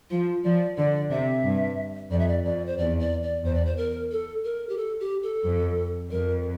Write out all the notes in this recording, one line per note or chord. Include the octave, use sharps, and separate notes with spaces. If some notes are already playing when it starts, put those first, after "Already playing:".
F3 F4
F3 D5
D3 D5
C3 E5
G2
F2 D5
E5
D5
F2 D5
C5
E2 D5
D5
D5
E2 C5
D5
C5
A#4
A4
A#4
G4
A4
G4
A4
F2
F2 A#4